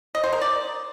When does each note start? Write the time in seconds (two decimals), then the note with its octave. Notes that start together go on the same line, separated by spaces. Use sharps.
0.15 D#5
0.24 C5
0.33 A#4
0.41 D5